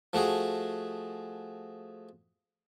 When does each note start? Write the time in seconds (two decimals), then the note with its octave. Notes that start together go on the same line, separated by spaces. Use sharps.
0.13 F3 A3 F#4 G#4